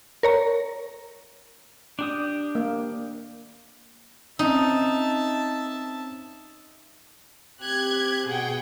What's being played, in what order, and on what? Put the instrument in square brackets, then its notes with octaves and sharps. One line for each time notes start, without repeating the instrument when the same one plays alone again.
[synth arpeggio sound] A#4 C#5 A#5
[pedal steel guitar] D4 G4 D#6
[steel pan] A#3
[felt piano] C4 C#4 [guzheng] D#4 [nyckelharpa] E5 A5
[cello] C4 G4 [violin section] F#6 G#6
[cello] B2 G#4 [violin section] F#5 G5